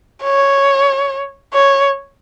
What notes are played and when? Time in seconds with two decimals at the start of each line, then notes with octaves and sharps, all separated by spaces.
0.23 C#5
1.53 C#5